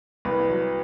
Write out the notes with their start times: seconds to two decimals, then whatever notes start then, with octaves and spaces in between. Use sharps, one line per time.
0.25 C2 B4
0.49 F#3